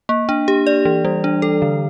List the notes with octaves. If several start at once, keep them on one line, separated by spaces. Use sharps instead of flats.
A#3
D4
G4
D5
E3
G3
D4
A4
D3